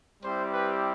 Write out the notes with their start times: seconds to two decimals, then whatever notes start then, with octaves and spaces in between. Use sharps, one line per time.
0.23 G3 C4 E4 G4 C5
0.51 B4